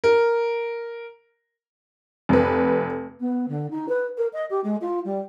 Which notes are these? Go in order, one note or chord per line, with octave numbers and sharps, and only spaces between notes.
A#4
F1 B4
B3
D3
D#4
B4
A#4
D#5
G4
G#3
F4
G3